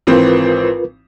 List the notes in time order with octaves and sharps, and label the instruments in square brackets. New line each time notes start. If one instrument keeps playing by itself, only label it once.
[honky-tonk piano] G#1 E3 C4 [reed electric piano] F4 A#4 B4